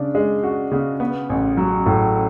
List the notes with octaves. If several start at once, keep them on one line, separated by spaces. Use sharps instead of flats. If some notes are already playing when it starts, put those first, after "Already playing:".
Already playing: C#3 D4
G#3
F#4
C#3
B3
A1
F#3
A2